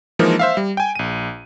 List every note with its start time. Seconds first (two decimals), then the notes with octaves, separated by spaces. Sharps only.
0.19 E3 F3 G#3 A#3 D#4 A#4
0.39 C5 E5 F5
0.57 G3
0.77 G5 G#5
0.95 A#1 D#7